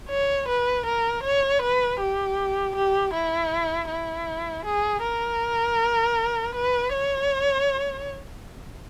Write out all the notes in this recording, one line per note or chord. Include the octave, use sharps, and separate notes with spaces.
C#5
B4
A#4
C#5
B4
G4
G4
E4
E4
G#4
A#4
B4
C#5